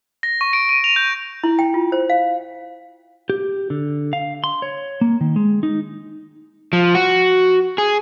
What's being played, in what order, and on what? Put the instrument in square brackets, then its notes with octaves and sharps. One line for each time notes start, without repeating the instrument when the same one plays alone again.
[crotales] A#6
C#6
D7
D#7
F7
G6
[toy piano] E4
G5
F4
C5
F5
[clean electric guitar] G4
D3
F5
C6
C#5
A#3
D#3
G#3
D#4
[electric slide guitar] F3
F#4
G#4